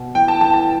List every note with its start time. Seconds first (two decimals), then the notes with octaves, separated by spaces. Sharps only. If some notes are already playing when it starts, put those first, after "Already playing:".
Already playing: B2
0.15 E3 G5
0.28 A5
0.41 E3 A5
0.54 A5